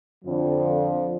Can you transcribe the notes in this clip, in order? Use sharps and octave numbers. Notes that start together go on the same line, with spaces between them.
F2 D3 F3